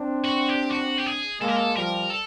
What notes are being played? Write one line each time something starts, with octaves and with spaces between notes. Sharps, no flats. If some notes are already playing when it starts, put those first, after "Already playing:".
Already playing: C4 D4
F#4
G4
F#4
G4
G#4
G#3 A#3 A4
A#4
A4
F3 G3 A#4
A4